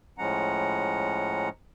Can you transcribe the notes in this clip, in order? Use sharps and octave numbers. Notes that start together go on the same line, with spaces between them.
A2 F3 G#3 C#4 F#5 A#5